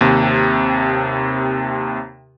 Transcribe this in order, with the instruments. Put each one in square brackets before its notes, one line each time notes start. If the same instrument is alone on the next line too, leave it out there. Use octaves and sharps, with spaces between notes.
[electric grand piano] D#2 C3